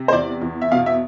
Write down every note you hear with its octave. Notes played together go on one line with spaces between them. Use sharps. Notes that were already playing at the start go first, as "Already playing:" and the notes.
Already playing: C3
C5
E2 D5
E2
E5
B2 F5
E5